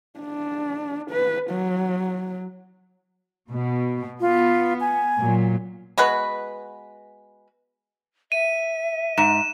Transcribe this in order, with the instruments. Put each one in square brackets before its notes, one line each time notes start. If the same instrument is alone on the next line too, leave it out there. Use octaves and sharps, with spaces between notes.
[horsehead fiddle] D4
B4
F#3
[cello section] B2
[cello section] B3 [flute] F4
[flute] G#5
[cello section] A#2 F#3
[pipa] G#3 B3 F#4 B4
[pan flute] E5 [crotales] D#7
[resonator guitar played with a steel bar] G#2 [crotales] E7